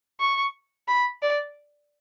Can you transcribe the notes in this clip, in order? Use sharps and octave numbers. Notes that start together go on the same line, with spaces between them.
C#6
B5
D5